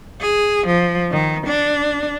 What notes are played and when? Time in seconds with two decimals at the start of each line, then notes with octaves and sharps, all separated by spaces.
0.21 G#4
0.67 F3
1.11 D#3
1.47 D4